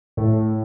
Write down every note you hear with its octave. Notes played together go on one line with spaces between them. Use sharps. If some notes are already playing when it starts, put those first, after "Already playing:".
A2